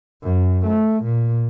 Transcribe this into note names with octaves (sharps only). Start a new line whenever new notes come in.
F#2
A3
A#2